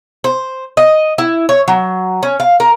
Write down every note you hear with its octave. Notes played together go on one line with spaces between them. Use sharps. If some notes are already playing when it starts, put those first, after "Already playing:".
C5
D#5
E4
C#5
F#3
C#4
F5
A#4